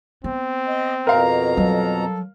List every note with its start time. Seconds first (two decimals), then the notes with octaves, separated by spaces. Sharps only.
0.24 B3 C4
0.68 D#5
1.07 F2 B2 A#4 F5 A#5
1.57 F#3 G3 A4